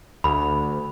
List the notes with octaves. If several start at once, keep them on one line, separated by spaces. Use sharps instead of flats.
D2 B5